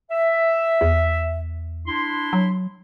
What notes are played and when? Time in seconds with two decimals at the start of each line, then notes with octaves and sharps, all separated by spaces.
0.10 E5
0.81 E2
1.87 D4 E4 C6
2.33 F#3